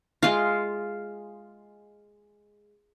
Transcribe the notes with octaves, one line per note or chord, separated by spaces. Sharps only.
G#3 F4